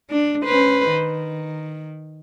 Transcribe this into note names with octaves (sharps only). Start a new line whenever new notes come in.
D4
C#4 B4 C5
D#3